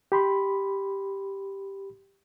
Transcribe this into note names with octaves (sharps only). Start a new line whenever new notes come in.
G4 B5 C6